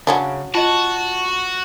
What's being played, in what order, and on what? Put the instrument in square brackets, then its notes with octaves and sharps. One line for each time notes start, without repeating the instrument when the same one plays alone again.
[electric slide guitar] C#3 [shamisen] F#3 C#4 D4
[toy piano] F4 D#5 [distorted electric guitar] F#4 [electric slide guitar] A5